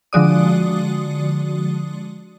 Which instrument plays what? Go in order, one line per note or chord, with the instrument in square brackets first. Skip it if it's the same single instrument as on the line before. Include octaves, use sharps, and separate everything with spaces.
[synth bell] D3 F3 G#3 F#4 D5 D#6